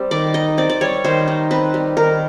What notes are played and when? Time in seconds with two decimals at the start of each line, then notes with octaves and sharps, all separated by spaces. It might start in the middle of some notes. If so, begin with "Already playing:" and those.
Already playing: G3 C4
0.11 D#3 D5
0.34 D#4 D#5
0.58 C4 D5
0.70 D5
0.81 G3 C#5
1.04 D#3 C5
1.28 D#4
1.51 C4 B4
1.74 G3
1.97 D#3 A#4